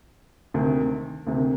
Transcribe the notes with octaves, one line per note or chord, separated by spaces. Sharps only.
D2 C3 D#3
D2 C3 D#3